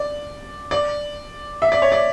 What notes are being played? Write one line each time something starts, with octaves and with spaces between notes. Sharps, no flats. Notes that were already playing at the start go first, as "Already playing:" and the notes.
Already playing: D5
D5
E5
D5
C#5
D5